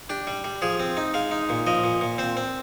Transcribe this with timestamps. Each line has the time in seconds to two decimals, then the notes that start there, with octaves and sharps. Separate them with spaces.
0.10 D4 G4
0.27 G3
0.44 G3
0.62 F3 G#4
0.80 C4
0.97 D#4
1.14 G#3 F5
1.31 D#4
1.49 A#2
1.67 F3 D#5
1.84 A#2
2.01 A#2
2.18 C4 C5
2.37 C4